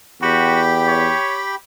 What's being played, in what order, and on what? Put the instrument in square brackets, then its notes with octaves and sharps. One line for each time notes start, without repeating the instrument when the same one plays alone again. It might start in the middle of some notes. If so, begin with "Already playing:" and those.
[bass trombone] E2 [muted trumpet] F#4 [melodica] G4 G5 B5
[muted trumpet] C#5